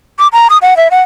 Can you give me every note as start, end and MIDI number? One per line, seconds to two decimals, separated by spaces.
0.19 0.28 86
0.33 0.48 82
0.50 0.58 87
0.62 0.77 78
0.77 0.88 76
0.91 1.02 78